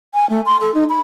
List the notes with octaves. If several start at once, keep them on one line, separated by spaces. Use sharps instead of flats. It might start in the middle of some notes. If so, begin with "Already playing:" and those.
G#5
A3
C6
A4
D#4
B5